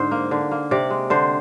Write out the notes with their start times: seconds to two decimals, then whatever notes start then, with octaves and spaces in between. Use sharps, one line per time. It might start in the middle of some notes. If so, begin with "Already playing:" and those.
Already playing: G#2 D3 C5
0.11 A#3
0.31 D3
0.51 A#3
0.71 C3 D5
0.90 G#3
1.10 D3 C5